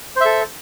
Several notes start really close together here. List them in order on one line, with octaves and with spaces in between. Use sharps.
C5 E5 A4